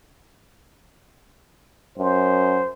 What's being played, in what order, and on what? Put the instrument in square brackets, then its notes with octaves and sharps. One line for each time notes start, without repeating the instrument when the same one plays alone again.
[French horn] F#2 [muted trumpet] C5